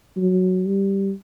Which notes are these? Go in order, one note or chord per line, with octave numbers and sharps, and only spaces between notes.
F#3
G3